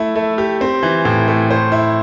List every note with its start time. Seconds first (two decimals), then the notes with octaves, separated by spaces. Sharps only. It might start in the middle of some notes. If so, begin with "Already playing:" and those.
Already playing: A3 E4
0.15 A3
0.38 G4
0.61 C4
0.83 E3
1.05 A2
1.28 A3
1.50 C5
1.72 E4